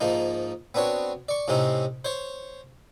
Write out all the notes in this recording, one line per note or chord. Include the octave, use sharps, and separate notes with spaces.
G#2 F3 A#3 D#4
B3 C4 D4 F#4 C#5
D5 C#6
A2 C3 C4 C#4 D#4
C5 C#5